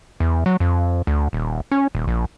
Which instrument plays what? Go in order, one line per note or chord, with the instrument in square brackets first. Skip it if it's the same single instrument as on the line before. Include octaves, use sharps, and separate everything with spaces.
[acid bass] E2
F#3
F2
D2
D#1
C#4
D#1
A#1